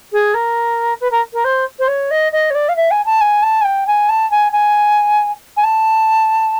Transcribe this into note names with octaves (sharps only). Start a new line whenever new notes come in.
G#4
A#4
B4
A#4
A#4
C5
C5
C#5
D#5
D#5
C#5
D5
F5
E5
G#5
A5
G#5
A5
G#5
G5
G#5
A5
G#5
G#5
G#5
A5